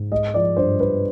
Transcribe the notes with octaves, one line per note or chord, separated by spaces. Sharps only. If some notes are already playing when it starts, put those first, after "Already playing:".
Already playing: G#2
G#3 D#5
F3 D5
G2 C5
G2 B4